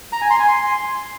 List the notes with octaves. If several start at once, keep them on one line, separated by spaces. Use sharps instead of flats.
A#5
G#5
C6
G#5
C6